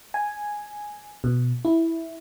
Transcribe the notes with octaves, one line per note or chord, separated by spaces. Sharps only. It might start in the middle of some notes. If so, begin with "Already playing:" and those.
G#5
B2
E4